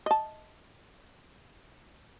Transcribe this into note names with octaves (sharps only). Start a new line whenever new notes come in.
D#5 A5